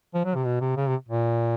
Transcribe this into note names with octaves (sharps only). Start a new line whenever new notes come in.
F3
F#3
C3
B2
C3
C#3
C3
A#2